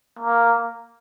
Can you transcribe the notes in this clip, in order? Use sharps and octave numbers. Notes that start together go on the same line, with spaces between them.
A#3